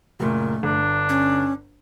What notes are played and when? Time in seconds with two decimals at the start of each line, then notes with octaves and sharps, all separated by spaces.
0.20 F#1 A#2 A3
0.63 G1 D4
1.09 C#4